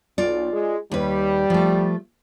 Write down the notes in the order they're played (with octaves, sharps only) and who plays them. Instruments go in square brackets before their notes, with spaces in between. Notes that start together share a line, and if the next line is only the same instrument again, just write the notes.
[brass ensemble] B1 [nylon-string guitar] F4 D5
[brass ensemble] G#3
[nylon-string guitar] D#2 B4 [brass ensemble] G3
[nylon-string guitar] F3 A3